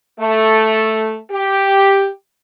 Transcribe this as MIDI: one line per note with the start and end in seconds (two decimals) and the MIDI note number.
0.19 1.18 57
1.31 2.08 67